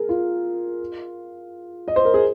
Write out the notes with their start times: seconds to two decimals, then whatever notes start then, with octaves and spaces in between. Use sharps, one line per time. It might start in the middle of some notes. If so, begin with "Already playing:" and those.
Already playing: G#4 A#4
0.09 F4
1.88 D#5
1.96 C5
2.05 A#4
2.14 G#4